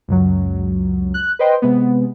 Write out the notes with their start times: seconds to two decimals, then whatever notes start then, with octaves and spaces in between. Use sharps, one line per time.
0.08 C#2 F#2 F#3
1.14 F#6
1.39 B4 C5 D#5 G5 C6
1.62 C3 G#3 B3